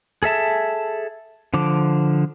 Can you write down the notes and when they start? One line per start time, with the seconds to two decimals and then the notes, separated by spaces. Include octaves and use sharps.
0.23 G#4 A4 E5 A5
1.54 D3 F3 D6